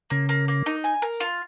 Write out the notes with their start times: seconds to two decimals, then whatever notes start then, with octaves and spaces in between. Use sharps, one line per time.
0.10 C#3 A#3
0.29 A#3
0.48 A#3
0.66 D#4
0.84 G#5
1.02 A#4
1.20 F4